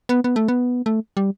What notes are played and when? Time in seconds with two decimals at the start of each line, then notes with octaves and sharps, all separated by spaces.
0.09 B3
0.24 B3
0.36 A3
0.48 B3
0.86 A3
1.17 G3